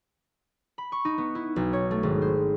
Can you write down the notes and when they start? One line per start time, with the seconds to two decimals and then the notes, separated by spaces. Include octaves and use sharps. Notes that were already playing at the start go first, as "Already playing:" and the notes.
0.78 B5
0.92 C#6
1.05 D#4
1.18 B3
1.35 E4
1.56 B1
1.73 C#5
1.91 A3
2.03 G#1
2.22 C5